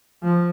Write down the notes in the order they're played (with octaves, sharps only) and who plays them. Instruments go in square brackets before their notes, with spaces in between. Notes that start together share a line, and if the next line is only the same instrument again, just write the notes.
[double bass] F3